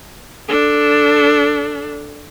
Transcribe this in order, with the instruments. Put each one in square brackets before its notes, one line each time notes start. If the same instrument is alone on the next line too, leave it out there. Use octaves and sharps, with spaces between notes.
[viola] D4 A4